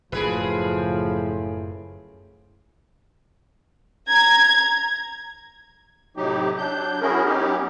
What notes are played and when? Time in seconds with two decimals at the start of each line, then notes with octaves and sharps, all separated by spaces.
0.12 F#1 A2 C#3 F3 G#4 B4
4.08 A#5 G#6
6.17 A2 C3 F#3 D#4 G4
6.58 F#3 D4 G6
7.01 C#4 E4 F#4 G#4 A#4
7.25 F#3 B3 C#4 D#4 G4